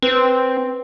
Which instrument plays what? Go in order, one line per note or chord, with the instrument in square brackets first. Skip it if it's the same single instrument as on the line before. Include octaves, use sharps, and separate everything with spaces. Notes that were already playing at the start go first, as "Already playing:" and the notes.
[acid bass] C4 [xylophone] B4